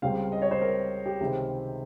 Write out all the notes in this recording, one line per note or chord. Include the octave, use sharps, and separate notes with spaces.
C#2 C#3 G3 C4 F5
D#5
C#5
C5
A#4
G4
C#2 C3 D#3 G#3 C4